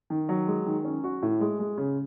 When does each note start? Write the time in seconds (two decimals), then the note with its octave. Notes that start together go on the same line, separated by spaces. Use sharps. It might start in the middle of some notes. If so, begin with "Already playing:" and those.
0.10 D#3
0.29 F#3
0.47 G#3
0.66 D#3
0.84 C#4
1.04 F#4
1.22 A2
1.41 G#3
1.59 G#3
1.78 C#3